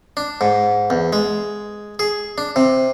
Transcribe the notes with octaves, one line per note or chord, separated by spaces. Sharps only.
D4
G#2
E2
G#3
G#4
D4
C3